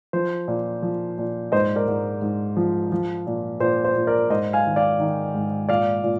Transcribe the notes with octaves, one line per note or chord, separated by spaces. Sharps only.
F3 C5
A#2
F3
A#2
G#2 C5 D#5
A#4 D5
G#2
G#2
F3
F3
A#2
A#2 C5
C5
A#2
A#4 D5
G#2 C5 D#5
F5 G#5
D#3
D5 F5
D#3
G#2
A#2 D5 F5
A#2